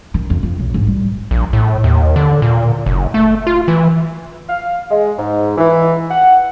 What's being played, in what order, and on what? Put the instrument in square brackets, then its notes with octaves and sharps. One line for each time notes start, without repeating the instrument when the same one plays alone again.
[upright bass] D#3
F2
F2
B1
G#2
G3
[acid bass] A#1
A2
D#2
D3
A#2
F#1
A3
F4
E3
[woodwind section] F5
G#3
G#2
E3
F#5